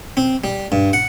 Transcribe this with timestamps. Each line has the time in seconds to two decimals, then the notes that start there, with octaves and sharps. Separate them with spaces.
0.17 C4
0.44 G3
0.72 G2
0.93 F#5